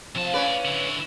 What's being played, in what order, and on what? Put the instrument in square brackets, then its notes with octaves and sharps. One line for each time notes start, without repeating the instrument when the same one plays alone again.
[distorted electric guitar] C3 A5 [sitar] F3
[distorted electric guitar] A2 D5 [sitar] C#4 B4
[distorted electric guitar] D3 E4